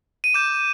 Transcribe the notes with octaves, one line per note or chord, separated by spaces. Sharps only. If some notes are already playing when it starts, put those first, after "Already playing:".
D#7
D6 G6 E7